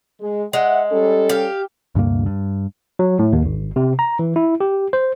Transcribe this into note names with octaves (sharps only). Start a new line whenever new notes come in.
G#3
G#3 E5 F#5
G3 C#4 A4
G4 F5
D2 G2 C3 A#3
G2
F#3
A2
D#2
G#1
C3
A#5
E3
E4
G4
C5